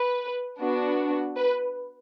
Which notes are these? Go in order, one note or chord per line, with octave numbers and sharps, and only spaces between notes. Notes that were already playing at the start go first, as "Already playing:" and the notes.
Already playing: B4
B3 D4 F#4
B4